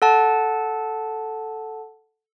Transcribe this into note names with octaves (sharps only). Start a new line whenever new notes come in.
A4 F#5 A5